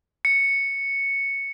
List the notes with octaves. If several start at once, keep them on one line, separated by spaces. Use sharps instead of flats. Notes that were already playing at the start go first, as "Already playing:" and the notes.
C#7